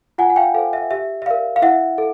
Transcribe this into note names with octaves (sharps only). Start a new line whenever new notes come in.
F4 F#5 G#5
F#5
F5 G5
A4 C5 F5
E5
G4 E5
E5
A#4 D5 F5
F5
E4 E5 F#5
A4